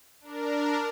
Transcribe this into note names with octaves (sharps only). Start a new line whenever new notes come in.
D4 A#4